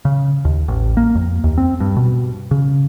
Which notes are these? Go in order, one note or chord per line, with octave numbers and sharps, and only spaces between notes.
C#3
D#2
A1
A#3
F2
D#2
C4
G2
B2
C#3